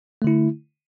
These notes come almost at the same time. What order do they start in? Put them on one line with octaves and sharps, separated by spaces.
A3 D3 E4